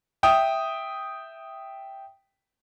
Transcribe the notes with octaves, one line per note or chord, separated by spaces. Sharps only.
E5 G5 D#6